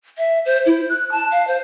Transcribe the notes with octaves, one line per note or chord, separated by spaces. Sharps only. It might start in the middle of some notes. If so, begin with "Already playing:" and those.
E5
C5
E4
F#6
A5
F5
C5